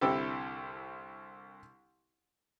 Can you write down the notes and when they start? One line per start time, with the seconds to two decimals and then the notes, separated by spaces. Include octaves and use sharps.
0.01 C2 D3 C4 E4 G4 A4